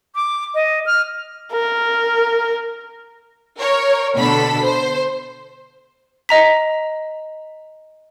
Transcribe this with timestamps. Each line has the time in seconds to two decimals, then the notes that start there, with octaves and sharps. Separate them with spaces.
0.15 D6
0.55 D#5
0.86 F6
1.52 A#4
3.58 A#4 C#5
4.17 B2 D3 A4 B5 B6
4.63 C5
6.29 D#5 A#5 B6